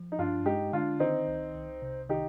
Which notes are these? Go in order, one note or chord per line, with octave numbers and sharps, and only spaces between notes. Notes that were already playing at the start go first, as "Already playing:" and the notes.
Already playing: F3
D#4
G2 D4 F4
G#3 D#4 G4
D3 D4 F4
D#3 C4 D#4
C2
C2
C3
D#3 D#4 G4